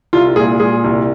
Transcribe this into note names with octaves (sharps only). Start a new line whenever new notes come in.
C2 F4
A#2 G#4
A#2 G#4
C2